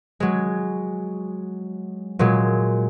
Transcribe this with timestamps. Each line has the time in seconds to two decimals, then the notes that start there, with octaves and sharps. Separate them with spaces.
0.20 F#3 G#3
2.19 A#2 F#3 G#3